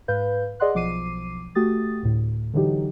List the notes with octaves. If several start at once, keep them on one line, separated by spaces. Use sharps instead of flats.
G#2 B4 F5 G6
G#4 D5 D#5 F#5 C6 F#6
B1 F3 D6 C7 D#7
A3 F#4 G4 D#6 A6
D2 A2
D3 E3 F#3 D#4 G4